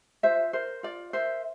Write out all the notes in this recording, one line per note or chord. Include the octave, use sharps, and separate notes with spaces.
F4 C5 E5
A#4 C5
F4 D5
A#4 C5 E5